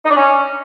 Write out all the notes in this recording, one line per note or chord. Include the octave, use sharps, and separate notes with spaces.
D#4
D4
C#4